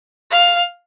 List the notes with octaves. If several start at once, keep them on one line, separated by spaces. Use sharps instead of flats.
F5